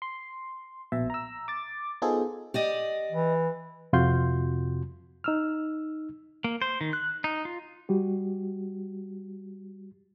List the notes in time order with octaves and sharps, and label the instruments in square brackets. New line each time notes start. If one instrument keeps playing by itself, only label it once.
[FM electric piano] C6
A#1 B2 E5
A#5 E6
D6 A6
B3 D#4 F4 G#4 A4 C5
[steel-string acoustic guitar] G4 D5 D#5
[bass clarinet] E3
[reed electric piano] F2 C3 F4 F#4 C6 G6
D#4 E6 F6
[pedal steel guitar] A#3
C5
D#3
F#6
D#4
F4
[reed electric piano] G3 F#4 G4